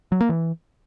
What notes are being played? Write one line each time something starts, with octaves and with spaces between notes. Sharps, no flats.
F#3
A#3
E3